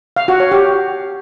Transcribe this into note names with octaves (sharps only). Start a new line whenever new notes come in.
F5
F#4
C#5
G4